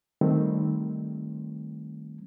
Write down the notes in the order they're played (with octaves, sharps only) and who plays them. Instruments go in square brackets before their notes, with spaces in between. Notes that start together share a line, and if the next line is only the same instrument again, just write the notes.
[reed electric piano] D#3 G3 A3 C4